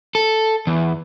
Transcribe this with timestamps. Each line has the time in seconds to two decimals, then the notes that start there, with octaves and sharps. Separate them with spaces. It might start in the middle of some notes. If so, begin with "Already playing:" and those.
0.15 A4
0.67 E2